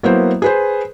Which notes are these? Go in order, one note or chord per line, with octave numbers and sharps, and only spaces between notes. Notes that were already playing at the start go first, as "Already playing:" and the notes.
F#3 A#3 B3 E4 C5
G#4 B4 C5